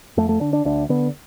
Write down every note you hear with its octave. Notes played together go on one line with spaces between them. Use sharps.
F2 A3
A3
D3 D4
D4
D2 D4
D3 B3